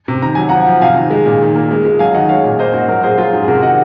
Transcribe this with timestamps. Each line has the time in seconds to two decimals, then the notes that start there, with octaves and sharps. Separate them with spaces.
0.08 C3
0.22 D#3 A#5
0.35 F#3 G#5
0.49 F3 F#5 A#5
0.67 F3
0.81 C3 F5 G#5
0.96 D#3
1.10 G#3
1.26 A#2
1.41 D#3
1.56 A#3
1.71 G#3
1.85 G#3
1.99 F#3 F5 G#5
2.14 D#3 D#5 F#5
2.29 G#3 C#5 F5
2.44 A#2
2.59 A#3 C5 D#5
2.73 G#2 F#4
2.88 F#3 F#4 A#4
3.03 A#2 G#4 C5
3.18 F#3 F4 G#4
3.33 G#2
3.43 G#4
3.48 C3 F#4 A#4
3.62 D#3 D#5 F#5